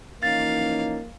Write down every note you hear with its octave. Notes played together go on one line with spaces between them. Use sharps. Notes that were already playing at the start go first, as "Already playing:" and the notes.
E3 F3 A#3 C#4 D#4 F5 A6